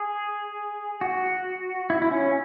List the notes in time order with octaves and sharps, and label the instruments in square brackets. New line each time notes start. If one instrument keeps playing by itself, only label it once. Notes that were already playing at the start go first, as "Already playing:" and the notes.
Already playing: [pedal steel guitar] G#4
F#4
E4
E4
C#4